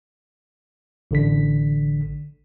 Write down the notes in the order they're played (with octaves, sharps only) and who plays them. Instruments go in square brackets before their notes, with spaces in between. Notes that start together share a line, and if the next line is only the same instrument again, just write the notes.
[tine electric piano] A1 D3 B6